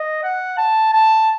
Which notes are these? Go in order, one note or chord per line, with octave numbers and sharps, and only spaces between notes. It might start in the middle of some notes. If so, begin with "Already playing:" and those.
Already playing: D#5
F#5
A5
A5